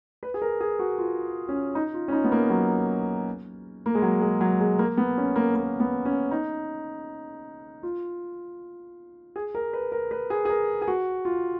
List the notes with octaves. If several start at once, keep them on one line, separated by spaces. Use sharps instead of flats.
B4
G#4
A#4
G#4
F#4
F4
C#4
D#4
F4
C#4
D#4
B3
A#3
F#3
A#3
G#3
F#3
G#3
F#3
G#3
A#3
B3
C#4
A#3
A#3
B3
C#4
D#4
F4
G#4
A#4
B4
A#4
B4
G#4
G#4
A#4
G#4
F#4
F4